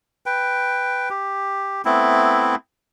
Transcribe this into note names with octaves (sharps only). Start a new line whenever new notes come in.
B4 G5
G4
A3 B3 C4 E4